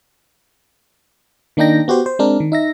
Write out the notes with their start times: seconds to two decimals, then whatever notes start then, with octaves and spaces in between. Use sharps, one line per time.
1.57 D#3 A#3 D4 D#4 G5 A#6
1.88 B3 F#4 G4 C5
2.06 C5
2.19 G#3 C4 D4 A#4
2.40 D#3
2.52 D#4 E5 A#6